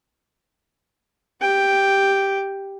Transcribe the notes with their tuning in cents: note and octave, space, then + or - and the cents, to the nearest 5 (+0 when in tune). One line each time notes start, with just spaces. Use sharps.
G4 +0 G5 +0